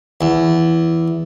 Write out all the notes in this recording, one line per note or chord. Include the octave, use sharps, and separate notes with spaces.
E2